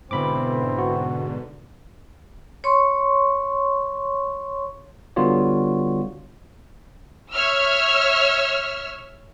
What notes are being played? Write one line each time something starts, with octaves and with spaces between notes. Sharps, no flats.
G#2 B2 D3 B3 C4 E4 B5 D6
F#4
C#5 C6 C#6
D3 G3 B3 F4 F#4 C#5
C#5 E5 E6 F6